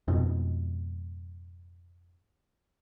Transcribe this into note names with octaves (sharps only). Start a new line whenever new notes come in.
F2 G#2 B2